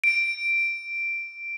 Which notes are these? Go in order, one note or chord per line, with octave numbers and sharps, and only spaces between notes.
D7